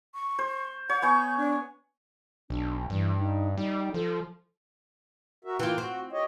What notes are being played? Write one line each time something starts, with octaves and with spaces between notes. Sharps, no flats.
C#6
C5
C#5 F#5
B3 G#5 C#6 G6
D4
B1 D4
G2 E3
D#4
G3 D#4
F3 A4
F#4 A#4 E5
E3 A#3 F4 F5 G5
C4 F#4
G4 C#5 D#5